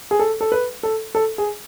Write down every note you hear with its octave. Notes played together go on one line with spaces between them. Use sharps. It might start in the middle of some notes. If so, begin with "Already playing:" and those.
G#4
A4
A4
B4
A4
A4
G#4